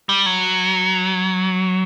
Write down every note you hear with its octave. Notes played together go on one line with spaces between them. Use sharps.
G3
F#3